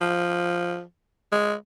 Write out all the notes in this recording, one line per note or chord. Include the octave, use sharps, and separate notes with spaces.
F3
G#3